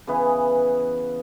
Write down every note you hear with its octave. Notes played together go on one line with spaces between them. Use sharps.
C#3 E3 B3